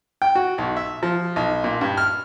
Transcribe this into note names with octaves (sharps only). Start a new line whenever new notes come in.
G5
F#4
B1
E5
F3
B1
A#2
G2
F6